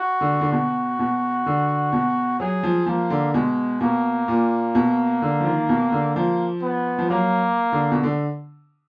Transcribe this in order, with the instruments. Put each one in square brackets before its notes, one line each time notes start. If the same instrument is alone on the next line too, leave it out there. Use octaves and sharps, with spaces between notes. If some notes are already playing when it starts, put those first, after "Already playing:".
Already playing: [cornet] F#4
[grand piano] D3
D3
[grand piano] B2 [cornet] F#4
[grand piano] B2
D3
B2
[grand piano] F#3 [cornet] G#4
[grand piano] F3
[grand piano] F3 [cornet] A#3
[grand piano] D3
[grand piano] B2 [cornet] G#3
[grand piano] B2 [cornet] A#3
[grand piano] A#2
B2
D3
F3
D#3
B2
D3
[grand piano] F3 [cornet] A#3
[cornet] B3
[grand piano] F3
[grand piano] F#3 [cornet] A#3
[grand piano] D3
B2
D3